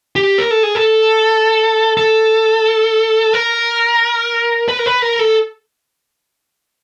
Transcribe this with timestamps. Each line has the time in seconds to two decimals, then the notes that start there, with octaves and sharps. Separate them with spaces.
0.16 G4
0.38 A#4
0.51 A4
0.63 G#4
0.75 A4
1.97 A4
3.33 A#4
4.68 B4
4.79 A#4
4.86 B4
5.02 A#4
5.19 A4